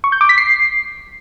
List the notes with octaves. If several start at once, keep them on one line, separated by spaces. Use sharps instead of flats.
C#6
G6
D6
B6
C7